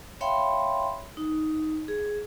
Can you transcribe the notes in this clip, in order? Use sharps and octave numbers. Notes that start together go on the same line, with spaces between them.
C#5 E5 F5 G5 B5 C6
D#4
G#4